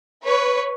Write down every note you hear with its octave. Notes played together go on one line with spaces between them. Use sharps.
B4 C#5